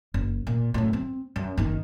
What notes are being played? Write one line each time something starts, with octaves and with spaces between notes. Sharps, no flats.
F#1
A#2
F#2 A2
C4
F#2
F#1 D#3